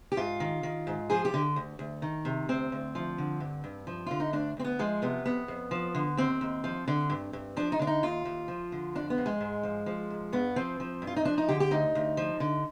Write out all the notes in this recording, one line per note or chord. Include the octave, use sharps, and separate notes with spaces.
G4
G#2 F4
D#3
D#3
G#2
F3 G#4
G4
D3
D2
D2
D#3
C3
D2 C4
D2
F3
D3
G2
G2
F3
D3 F4
D#4
D2 D4
D2 C4
B3
F3 G#3
C3 B3
F2 B3
F2
F3
D3
D#2 C4
D#2
F3
D3
G2
G2
F3 D4
D#4
D3 D4
D#4
D#2 F4
D#2
F3
D3
F2 D4
B3
F2
G#3
G#2
F3
F3
G#2
G2 B3
F3 C4
F3
G2
F4
D#4
F3 D4
D#4
D3 G4
G4
D2 D#4
D2
F3
D3